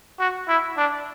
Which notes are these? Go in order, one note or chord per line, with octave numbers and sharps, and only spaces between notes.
F#4
E4
D4